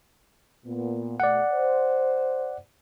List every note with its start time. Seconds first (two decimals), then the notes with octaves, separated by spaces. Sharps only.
0.64 A#2 B3
1.20 B2 A3 D5 F#5
1.53 C5